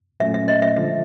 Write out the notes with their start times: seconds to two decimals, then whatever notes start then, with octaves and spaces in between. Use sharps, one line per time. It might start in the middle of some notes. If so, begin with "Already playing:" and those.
0.20 A#2 F#3 A3 C#4 E5
0.34 E5
0.48 D#5
0.62 E5
0.77 D3 F3 G#3 E5